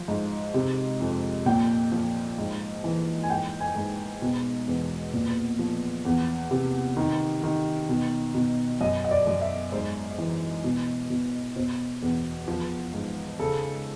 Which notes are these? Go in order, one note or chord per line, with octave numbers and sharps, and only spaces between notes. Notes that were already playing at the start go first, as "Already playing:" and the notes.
Already playing: F3
G#2
C3
F2
A#2 G5
F3
G#2
E3
G#5
G#2 G5
G#5
G#2
B2
E2
A#2
F3
E2
C3
D#3
D#3
B2
B2
F#2 D#5
D#5
D5
F#2
E5
G#2 C5
E3
B2
B2
B2 C5
E2
F3
G#2
C#3 A4